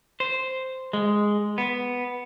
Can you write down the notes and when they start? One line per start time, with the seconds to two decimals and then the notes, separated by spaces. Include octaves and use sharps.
0.20 C5
0.93 G#3
1.58 B3